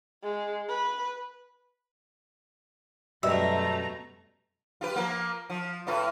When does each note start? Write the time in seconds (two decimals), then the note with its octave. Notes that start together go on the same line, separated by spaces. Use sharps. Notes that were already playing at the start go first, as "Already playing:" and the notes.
0.23 G#3
0.68 B4
3.23 F#2 B2 G3 A3 E5 A#5
4.81 F4 G4 B4
4.96 F3 A#3
5.50 F3
5.87 A2 F4 B4